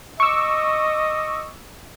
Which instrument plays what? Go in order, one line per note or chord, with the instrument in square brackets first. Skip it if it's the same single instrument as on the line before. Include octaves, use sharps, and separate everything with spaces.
[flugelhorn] D#5 [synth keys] C#6 D6 E6